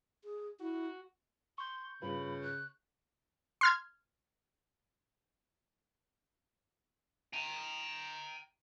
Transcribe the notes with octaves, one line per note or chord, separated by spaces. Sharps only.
G#4
E4 F#4
C6 C#6 G6
G2 C#3 F4 B4 B5
F#6
C6 F6 G#6
G5 A#5